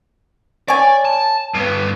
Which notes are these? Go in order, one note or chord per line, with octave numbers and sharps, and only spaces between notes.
C#5 D5 G#5
A5
G2 B3